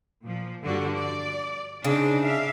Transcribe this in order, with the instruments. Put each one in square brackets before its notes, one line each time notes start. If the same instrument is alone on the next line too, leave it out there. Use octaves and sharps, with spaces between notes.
[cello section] A#2 F3
G2 D3 F#4
D5
[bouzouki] C#3 [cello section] D4 D#4 C5
[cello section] E5 F5